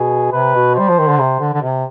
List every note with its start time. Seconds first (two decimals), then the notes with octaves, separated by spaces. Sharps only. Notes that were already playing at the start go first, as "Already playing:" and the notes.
Already playing: B2 G#4
0.32 C3 B4
0.55 B2
0.76 G3 C5
0.89 F3
0.99 D#3
1.09 D3
1.19 C3
1.40 D3
1.54 D3
1.62 C3